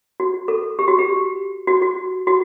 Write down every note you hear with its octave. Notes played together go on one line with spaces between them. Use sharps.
F#4
A4
G4
F#4
G4
F#4
F#4
F#4